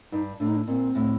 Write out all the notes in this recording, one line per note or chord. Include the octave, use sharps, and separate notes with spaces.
G2 D#4
A2 D4
D#4
D4
A#2 C4
A2